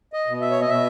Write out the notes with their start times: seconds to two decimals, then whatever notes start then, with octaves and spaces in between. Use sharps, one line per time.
0.13 D#5
0.27 B2
0.41 E5
0.51 C#5
0.61 D#5
0.69 B2 E5